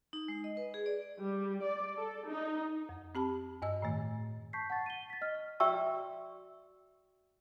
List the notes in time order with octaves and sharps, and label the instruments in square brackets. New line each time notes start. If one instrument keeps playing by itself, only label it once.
[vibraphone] D#4
G#3
D#5
B4
G#4
D5
[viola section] G3
D5
A4
D#4
[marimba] F2
C4 G4 A5 B5
G2 D#5 E6
A2 D#3 A3
[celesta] A5 C#6 G6 B6 C7
F#5 A5 C#6 A6
D#7 G7
A6 B6
D#5 F6
F6
[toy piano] F#4 D5 E5 G5 C#6 E6